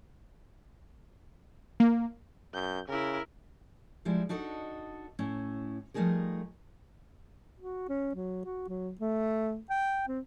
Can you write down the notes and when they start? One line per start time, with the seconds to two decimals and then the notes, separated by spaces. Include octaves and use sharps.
1.80 A#3
2.54 F#2 G6
2.88 C#3 E4 A#4
4.05 F3 G3 G#3 E4
4.29 D4 D#4 F#4 A4 D#5
5.19 A2 C#4 E4
5.94 F3 G3 A3 D#4 G#4 A#4
7.59 F#4
7.89 C#4
8.15 F#3
8.45 F#4
8.68 F#3
9.00 A3
9.70 G5
10.08 C4